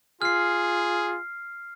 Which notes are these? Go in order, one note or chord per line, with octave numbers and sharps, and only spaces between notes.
F4 G#4 F6 C7